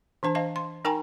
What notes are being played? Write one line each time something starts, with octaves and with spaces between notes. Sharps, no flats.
E3 D4 C5 A5
C5 D#5 F5 A5
C6
D#4 A#4 G5 G#5 A#5 C#6